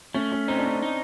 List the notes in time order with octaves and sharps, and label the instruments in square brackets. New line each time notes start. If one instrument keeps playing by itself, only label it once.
[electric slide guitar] A3 [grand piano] C#4
[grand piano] C#4
[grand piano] C4 [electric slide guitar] D#4
[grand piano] D4
C#4
[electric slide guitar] D#4